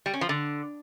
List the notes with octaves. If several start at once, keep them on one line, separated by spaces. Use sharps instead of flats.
G3
C#4
F3
D3